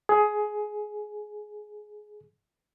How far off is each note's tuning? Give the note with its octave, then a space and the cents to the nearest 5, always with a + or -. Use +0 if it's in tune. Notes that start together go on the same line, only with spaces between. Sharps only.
G#4 +15